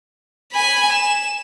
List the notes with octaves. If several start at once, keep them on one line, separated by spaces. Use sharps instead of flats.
G#5 B5
E7